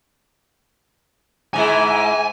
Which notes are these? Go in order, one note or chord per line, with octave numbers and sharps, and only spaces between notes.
G#2 G#3 E4 G#5